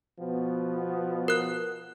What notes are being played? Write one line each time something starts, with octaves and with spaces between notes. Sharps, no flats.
B2 F3 B3
A#4 F#6